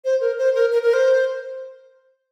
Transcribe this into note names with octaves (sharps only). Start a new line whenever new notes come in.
C5
A#4
C5
A#4
A#4
A#4
C5